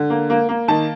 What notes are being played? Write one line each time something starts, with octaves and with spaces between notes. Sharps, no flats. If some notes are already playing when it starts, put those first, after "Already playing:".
Already playing: D3
A#3
A#3
A#3
D#3 A5